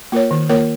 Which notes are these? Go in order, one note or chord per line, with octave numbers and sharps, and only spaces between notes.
A#3 F4 A#4 C#5
D#3
A#3 F4 A#4 C#5